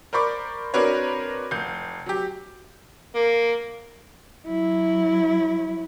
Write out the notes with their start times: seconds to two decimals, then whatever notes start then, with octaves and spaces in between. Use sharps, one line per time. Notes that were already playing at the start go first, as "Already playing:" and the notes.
0.13 A#4 C5 D5 B5 C#6 D6
0.74 C4 D4 F#4 A#4 B4 C#5
1.51 F1 G6
2.06 F#3 G4
3.16 A#3
4.47 F#3 E4